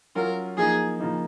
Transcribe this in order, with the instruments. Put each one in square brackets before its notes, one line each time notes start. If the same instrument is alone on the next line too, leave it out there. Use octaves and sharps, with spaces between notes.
[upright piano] F#3 C#4 F4 [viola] A#4
[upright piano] F3 A#3 D#4 [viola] G#4
[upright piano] C#3 F3 A#3 D#4